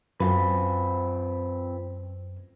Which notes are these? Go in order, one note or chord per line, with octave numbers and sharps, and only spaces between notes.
F#2 C4 F4 B4